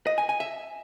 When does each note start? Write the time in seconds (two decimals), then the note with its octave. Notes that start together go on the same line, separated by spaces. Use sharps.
0.07 D#5
0.18 G#5
0.29 G#5
0.40 E5